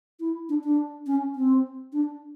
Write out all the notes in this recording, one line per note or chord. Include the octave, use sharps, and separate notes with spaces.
E4
D4
D4
C#4
C4
D4